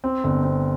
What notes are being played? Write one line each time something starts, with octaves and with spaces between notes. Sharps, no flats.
C4
G1
C4